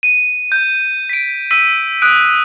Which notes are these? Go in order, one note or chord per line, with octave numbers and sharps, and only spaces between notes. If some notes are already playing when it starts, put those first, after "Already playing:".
D#7
G6
B6 D7
E6 B6 D#7
D#6 F#6 D7